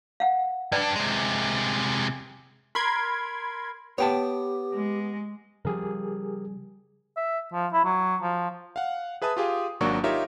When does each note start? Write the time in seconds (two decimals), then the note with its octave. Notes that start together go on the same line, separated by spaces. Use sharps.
0.20 F5 F#5
0.72 G2 D4 B4 D5
0.96 C3 G#3
2.75 A#4 B5 C6 G#6
3.98 B3 G4 C#5 G5 A5
4.74 G#3
5.65 C#3 F3 G3 G4 G#4 A#4
7.17 E5
7.53 F3
7.73 E4
7.84 F#3
8.22 F3
8.76 F5 F#5
9.22 G#4 B4 E5 A5 D#6
9.37 F4 G4 G#4 F5
9.81 G#1 F#3 A#3 D4 F#4 C#6
10.04 D#4 F4 G4 A#4 C#5 E5